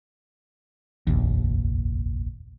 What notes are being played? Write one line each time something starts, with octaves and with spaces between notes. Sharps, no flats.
F1 A#1 D#2